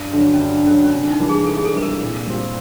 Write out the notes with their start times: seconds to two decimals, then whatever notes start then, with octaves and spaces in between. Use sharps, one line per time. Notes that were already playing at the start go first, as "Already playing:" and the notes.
Already playing: G2
0.13 D3 F#3 D4
0.34 C#4
0.40 G2 D4
0.66 D3 F#3 C#4
0.84 C#4
0.93 C3 D4
1.11 D#4
1.20 E3 G3 A#3 D4
1.29 G#4
1.47 C3 A4
1.57 G#4
1.65 A4
1.74 E3 G3 A#3 D4 B4
1.82 A#4
2.01 A#2
2.27 G3 C4 F4